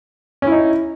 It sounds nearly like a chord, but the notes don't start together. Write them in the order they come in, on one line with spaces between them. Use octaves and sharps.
C#4 E4 D#4